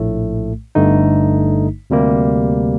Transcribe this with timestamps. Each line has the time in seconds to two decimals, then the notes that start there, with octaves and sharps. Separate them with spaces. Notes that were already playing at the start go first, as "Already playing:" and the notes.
Already playing: A#1 A2 A3
0.75 G1 G2 D3 A3 D#4
1.90 D2 C3 G3 A#3